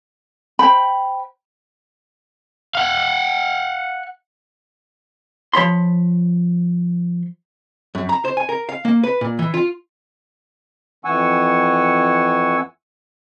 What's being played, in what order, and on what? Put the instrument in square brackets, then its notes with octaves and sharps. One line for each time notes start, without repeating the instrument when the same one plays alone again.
[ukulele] C5 G5 B5
[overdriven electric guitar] F5 F#5
[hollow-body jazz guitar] F3 C#5 B5 C6
F#2
A#5
C5
G#5
A#4
F5
A#3
B4
A#2
E3
F4
[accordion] F2 E3 F#5 G#5 C#6 E6